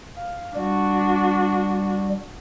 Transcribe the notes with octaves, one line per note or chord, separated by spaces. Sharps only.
F5
G3 D4 F#4